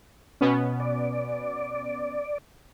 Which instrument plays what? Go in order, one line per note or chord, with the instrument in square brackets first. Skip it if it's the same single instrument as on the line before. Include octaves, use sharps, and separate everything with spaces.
[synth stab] B2 B3 C#4
[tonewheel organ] D5